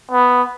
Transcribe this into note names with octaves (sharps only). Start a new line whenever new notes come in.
B3